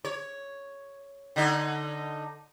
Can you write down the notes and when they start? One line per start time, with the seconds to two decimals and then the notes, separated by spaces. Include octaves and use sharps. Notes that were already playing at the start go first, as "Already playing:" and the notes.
0.05 C#5
1.36 D3 D#4